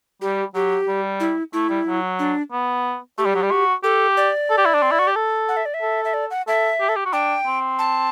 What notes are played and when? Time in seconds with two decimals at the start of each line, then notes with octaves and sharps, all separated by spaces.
0.21 G3 G4
0.55 F#3 G4
0.88 G3
1.20 E4
1.53 A3 E4
1.69 G3
1.87 F#3
2.19 D4
2.52 B3
3.18 A3 G4
3.26 G3
3.35 F#3
3.43 G3
3.51 F#4
3.83 G4 A4
4.17 D5
4.50 A4
4.58 G4
4.66 E4
4.74 D4
4.82 C4
4.91 E4
4.99 F#4
5.07 G4
5.16 A4
5.49 F#5
5.57 E5
5.65 D5
5.74 E5
5.82 A4
6.05 E5
6.14 D5
6.31 F#5
6.47 A4 E5
6.80 G4
6.89 A4
6.96 G4
7.05 F#4
7.13 D4 G5
7.47 C4
7.79 A5